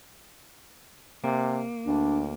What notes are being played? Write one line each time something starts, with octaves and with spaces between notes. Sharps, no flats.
C3 A#3
D2 D4